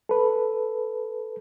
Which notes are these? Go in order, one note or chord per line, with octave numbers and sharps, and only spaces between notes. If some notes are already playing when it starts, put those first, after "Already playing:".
A4 B4